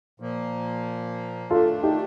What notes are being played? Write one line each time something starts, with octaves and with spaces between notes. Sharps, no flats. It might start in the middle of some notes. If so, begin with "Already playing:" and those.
A#2 F3 A#3
D#3 A3 D4 F4 A4
D#4 G4